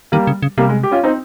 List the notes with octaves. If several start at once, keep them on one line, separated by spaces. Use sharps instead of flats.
D#3 G3 A#3
C#3
C#3
C3 G3 A#3
G#3
G4
C#4 F4
C4 D#4